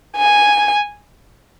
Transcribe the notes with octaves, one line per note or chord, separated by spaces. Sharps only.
G#5